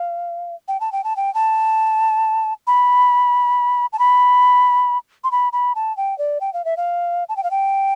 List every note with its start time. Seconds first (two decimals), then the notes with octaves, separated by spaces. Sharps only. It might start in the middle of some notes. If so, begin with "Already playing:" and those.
Already playing: F5
0.68 G5
0.80 A5
0.92 G5
1.04 A5
1.16 G5
1.34 A5
2.67 B5
3.93 A5
3.99 B5
5.24 C6
5.31 B5
5.53 B5
5.75 A5
5.97 G5
6.18 D5
6.41 G5
6.53 F5
6.65 E5
6.77 F5
7.29 A5
7.37 G5
7.43 F5
7.51 G5